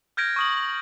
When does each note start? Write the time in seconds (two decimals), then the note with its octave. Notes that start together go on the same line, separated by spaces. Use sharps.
0.17 F6 G6 G#6 A#6 D7
0.36 C#6 D#6 F#7